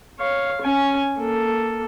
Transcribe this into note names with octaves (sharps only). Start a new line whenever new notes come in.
C#5 F5
C#4 G#5
A#3 A4